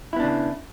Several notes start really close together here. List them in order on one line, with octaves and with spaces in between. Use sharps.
E4 B3 D4 C#3